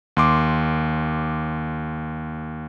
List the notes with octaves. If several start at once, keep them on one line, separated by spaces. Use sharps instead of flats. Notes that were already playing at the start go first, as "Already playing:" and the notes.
D#2 C6 D6